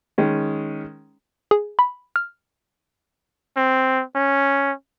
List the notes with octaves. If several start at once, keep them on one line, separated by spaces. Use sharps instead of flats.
D#3 G#3 C#4
G#4
B5
F6
C4
C#4